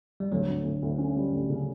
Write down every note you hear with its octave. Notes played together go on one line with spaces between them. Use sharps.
G3
D2 F#3
D2
D2
D2
C#4
G3
D2
C#3